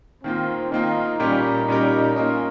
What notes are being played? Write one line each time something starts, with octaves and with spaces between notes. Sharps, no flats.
D#3 A#3 C4 F4
D#3 A#3 D#4 F4
A#2 G3 C#4 D#4 G4 A#4
A#2 G3 C#4 G4 A#4
A#3 C#4 F4 A#4 D#5